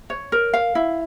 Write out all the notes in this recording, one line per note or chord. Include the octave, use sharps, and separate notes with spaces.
C#5
A#4
F5
E4